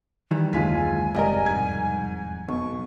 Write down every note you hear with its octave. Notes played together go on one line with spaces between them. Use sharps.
D#3 E3 G3
F#1 D#2 D3 D#3 G#3 F4 G#5 B6
F#1 C2 G4 A#4 D5 D#5
E1 F2 G#2 G#6
B1 B2 F#3 C#6